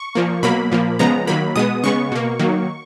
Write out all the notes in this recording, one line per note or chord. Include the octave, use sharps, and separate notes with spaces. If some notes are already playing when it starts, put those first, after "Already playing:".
Already playing: C#6
A#2 F3 A#3
B2 F#3 A#3 B5
A#2 F3 A#3
C#3 F3 G#3 B3 A#5
D#3 F#3 A#3 B5
B2 G#3 B3 D#6
C#3 G#3 B3 C#6
B2 A#3
D#3 F#3 A#3